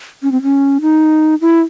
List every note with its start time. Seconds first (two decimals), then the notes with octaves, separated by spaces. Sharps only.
0.23 C#4
0.32 C4
0.43 C#4
0.82 D#4
1.41 E4